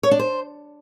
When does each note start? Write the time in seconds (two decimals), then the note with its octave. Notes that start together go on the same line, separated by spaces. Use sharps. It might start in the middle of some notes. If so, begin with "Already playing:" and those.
0.03 C#5
0.11 D4
0.19 C5